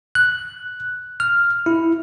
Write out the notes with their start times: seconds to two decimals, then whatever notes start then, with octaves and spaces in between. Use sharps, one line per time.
0.15 F#6
1.20 F6
1.66 E4